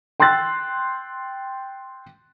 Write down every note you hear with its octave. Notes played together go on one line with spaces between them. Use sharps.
G5 C6 E6 F#6 A6